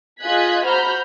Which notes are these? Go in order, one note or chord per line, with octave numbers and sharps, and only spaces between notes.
F4 G#4 D#5 F#6 G#6 B6
F#4 C5 A#5 B5 F6 G6